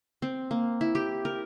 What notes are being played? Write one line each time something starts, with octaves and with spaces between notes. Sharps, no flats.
C4
A#3
E4
G4
A#4